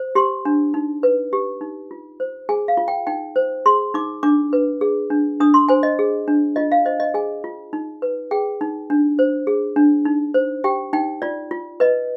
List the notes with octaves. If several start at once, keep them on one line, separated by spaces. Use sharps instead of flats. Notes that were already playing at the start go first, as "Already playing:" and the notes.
Already playing: C5
G4 C6
D4
D#4
B4
G4
D#4
F4
C5
G#4 G#5
F5
F4
G5
D#4 G5
C5
G#4 C6
D#4 D6
D4 D6
B4
G#4
D4
D4 D#6
C6
C5 G#5
D#5
G#4
D4
F4 D#5
F5
C5 D#5
D#5
G#4 G#5
F4
D#4
B4
G#4 G5
D#4
D4
C5
G#4
D4
D#4
C5
G4 G5
D#4 G5
F4 D5
F4
B4 D#5